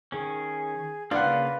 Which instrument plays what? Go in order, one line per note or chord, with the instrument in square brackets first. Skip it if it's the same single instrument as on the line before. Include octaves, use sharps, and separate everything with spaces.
[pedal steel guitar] D#3 C#4 [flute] G#4
[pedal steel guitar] C#3 A#3 [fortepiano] D4 F#5 [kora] F4 [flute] B4